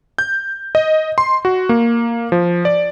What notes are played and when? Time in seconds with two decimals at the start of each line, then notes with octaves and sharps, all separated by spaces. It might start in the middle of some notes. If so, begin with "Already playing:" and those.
0.18 G6
0.75 D#5
1.18 C6
1.45 F#4
1.69 A#3
2.32 F3
2.65 D5